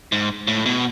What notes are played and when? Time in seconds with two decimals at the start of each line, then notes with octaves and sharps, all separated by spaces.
0.12 G#2
0.47 A2
0.66 B2